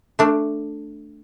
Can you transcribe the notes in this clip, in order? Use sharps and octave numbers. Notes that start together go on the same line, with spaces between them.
A3 D4